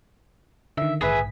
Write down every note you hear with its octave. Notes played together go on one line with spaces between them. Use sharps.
D3 D#3 E5
A#1 G#2 G#4 B4 E5 B6